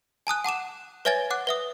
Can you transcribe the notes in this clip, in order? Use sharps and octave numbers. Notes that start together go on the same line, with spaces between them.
G#5 A5 D#6 F#6
F#5 A5 D6 E7
B4 C#5 E5 G#5 G#6 A6
F#5 D6 F#6
B4 E5 D#6